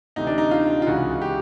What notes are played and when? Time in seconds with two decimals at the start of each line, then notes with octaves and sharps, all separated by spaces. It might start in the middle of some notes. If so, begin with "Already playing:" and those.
0.16 D2 C3 E3 D#4
0.27 D4
0.38 D#4
0.51 F4
0.82 F4
0.87 C#2 C#3 E3 F#4
1.21 G4